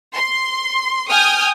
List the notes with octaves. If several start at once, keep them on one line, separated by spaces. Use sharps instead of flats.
C6
G5 G#5 D#6 F6 G6